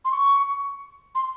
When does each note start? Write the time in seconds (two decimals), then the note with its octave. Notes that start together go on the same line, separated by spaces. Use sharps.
0.05 C6
0.12 C#6
1.15 C6